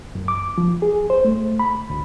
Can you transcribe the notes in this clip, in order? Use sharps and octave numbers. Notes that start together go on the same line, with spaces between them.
F#2
D6
F3
G#4
C5
A3
B5
D2